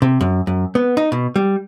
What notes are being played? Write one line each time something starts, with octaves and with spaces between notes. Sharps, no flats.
C3
F#2
F#2
B3
D#4
B2
G3